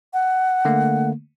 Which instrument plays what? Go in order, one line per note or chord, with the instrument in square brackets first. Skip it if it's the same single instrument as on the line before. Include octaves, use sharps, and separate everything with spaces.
[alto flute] F#5
[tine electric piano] D3 A3 A#3